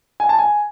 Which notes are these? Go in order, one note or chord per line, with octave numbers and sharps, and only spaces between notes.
G#5
A5
G#5